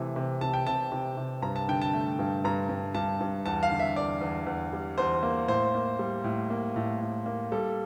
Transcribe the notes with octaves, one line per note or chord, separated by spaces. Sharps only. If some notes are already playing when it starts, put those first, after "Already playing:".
Already playing: C3 E3 A3
C3
C3 A5
G5
C3 A5
C3
C3
G2 A#5
A5
D3 G5
A5
A3
G2
G2 A#5
G2
G2 A5
G2
E2 A5
F5
D3
E5
E2 D5
E2
E2
G3
E2 C5
A#3
A2 C5
A#3
G3
A2
A#3
A2
A2
A#3
G3 A4